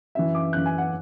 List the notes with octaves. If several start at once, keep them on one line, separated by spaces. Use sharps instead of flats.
F#2 E3 E5
D6
F#2 E3 F#6
G#5
F#5